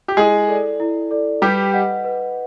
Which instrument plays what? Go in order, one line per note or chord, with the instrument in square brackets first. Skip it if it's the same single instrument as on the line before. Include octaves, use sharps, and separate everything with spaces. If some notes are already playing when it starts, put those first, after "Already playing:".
[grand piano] G4
[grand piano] G#3 G#4 [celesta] E4
[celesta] A4 D5
E4
A4 D5
[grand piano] G3 G4 [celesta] B4
[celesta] D#5 F#5
B4